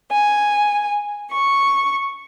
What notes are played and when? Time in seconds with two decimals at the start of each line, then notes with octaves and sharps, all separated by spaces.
0.12 G#5
1.31 C#6